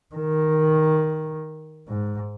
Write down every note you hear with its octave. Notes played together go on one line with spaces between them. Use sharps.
D#3
G#2